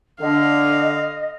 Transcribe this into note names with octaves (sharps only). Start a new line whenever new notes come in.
D3 D#5 F5